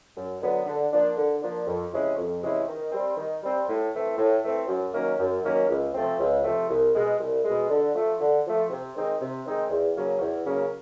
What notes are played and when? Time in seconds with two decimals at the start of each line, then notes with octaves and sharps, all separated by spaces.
0.16 F#2
0.42 D3 F#3 B3
0.66 D3
0.91 F3 A#3 D4
1.17 D3
1.42 F3 A#3 D4
1.67 F2
1.92 C3 E3 G#3 C#4
2.18 F2
2.43 C3 E3 G#3 C#4
2.68 D#3
2.92 G3 C4
3.17 D#3
3.42 G3 C4
3.68 A2
3.94 E3 A3 C4
4.18 A2
4.44 E3 A3 C4
4.68 F#2
4.94 D#3 F#3 A#3 C#4
5.19 F#2
5.44 D#3 F#3 A#3 C#4
5.69 C#2
5.94 C3 F3 A3 C4
6.20 C#2
6.44 C3 F3 A3 C4
6.69 C2
6.94 B2 G#3
7.20 C2
7.45 B2 G#3
7.70 D3
7.94 F3 A3
8.20 D3
8.45 F3 A3
8.70 C3
8.95 D#3 G#3 C4 D#4
9.21 C3
9.45 D#3 G#3 C4 D#4
9.70 E2
9.96 C#3 F#3 A#3 C#4
10.21 E2
10.45 C#3 F#3 A#3 C#4